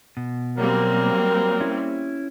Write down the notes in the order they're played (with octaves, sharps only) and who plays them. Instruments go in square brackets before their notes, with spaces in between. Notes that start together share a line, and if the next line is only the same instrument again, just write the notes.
[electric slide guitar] B2
[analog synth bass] F#3 [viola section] G3 A#3 C4 [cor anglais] A#4
[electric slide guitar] C#4 E4